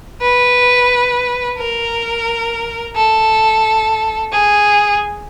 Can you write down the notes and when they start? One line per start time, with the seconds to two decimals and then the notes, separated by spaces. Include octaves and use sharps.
0.21 B4
1.58 A#4
2.95 A4
4.32 G#4